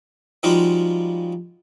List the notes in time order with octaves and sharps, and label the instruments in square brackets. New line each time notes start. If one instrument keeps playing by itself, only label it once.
[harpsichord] F3 G3 G#3 D#4 F4 F#4